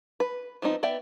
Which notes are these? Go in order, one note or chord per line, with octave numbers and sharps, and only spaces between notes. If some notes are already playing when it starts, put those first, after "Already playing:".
B4
F3 B3 C4 D#4
B3 D5 E5 G5